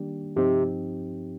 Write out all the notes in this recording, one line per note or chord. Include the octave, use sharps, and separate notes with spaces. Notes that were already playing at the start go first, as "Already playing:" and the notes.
Already playing: D#3 G3 A#3 D4 G4
G2 C3 F3 C4 D#4 G4